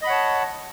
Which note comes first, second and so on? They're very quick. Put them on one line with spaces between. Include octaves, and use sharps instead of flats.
D#5 B5 F#5 C#5 A5